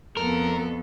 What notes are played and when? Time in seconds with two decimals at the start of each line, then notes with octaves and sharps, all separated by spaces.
0.17 F2 B3 A4 A#4